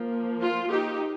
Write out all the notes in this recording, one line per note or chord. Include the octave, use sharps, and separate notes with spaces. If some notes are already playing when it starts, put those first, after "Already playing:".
Already playing: F3 A#3
F4
D#4 G4